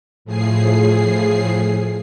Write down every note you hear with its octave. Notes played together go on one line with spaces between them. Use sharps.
A2 F3 G#4 C7